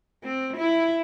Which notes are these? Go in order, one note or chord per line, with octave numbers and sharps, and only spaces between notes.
C4
E4